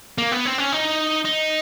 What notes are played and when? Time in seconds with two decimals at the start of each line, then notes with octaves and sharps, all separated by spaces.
0.18 A#3
0.32 B3
0.45 C4
0.58 C#4
0.72 D#4
1.25 D#4